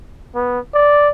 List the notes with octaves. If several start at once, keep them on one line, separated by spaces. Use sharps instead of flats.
B3
D5